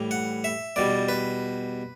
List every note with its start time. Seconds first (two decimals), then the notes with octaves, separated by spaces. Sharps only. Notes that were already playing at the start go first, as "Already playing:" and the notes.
Already playing: A2 E3 G3
0.11 F#5
0.44 E5
0.76 E2 B2 G3 D5
1.09 B4